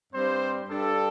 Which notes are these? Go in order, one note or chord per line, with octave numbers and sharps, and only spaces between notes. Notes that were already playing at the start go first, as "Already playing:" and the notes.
G2 G3 C4 C5
G2 G3 D4 A4